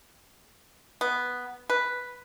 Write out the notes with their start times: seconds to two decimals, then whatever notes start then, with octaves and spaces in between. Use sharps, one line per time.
1.01 B3
1.70 B4